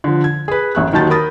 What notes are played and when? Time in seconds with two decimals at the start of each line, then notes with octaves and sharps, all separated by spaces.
0.04 D3 F3
0.24 G#6
0.48 G#4 B4
0.75 A1 F#2 E5 C#6 F#6
0.93 D#2 D#3 F#3 A5 G6 A6
1.10 A#4 B5 D#6 A6